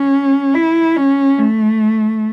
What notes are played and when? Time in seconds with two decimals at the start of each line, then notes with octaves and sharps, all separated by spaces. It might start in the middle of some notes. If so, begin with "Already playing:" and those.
Already playing: C#4
0.54 E4
0.96 C#4
1.38 A3